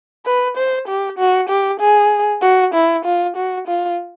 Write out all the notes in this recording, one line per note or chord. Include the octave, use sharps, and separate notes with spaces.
B4
C5
G4
F#4
G4
G#4
F#4
E4
F4
F#4
F4